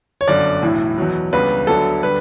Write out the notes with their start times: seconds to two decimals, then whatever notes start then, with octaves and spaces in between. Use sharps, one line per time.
0.21 C#5
0.28 G1 F#2 D3 F#3 D5
0.62 B1 A2 E3
0.98 E2 B2 F#3
1.33 C#2 C#3 G3 B3 D4 B4
1.67 D2 D3 F#3 B3 D4 A4
2.03 D3 G3 D4 B4